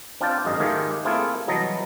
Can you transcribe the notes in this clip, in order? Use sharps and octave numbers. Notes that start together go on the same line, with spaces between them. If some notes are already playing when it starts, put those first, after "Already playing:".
C4 D4 F4 G5 A5
G#1 F#2 G#3 A#4 D#5
G#2 D#3 A3 F4 G4 G#4
A3 A#3 C4 E4 F4 G#4
C2 E3 F#3 D#5 A5 A#5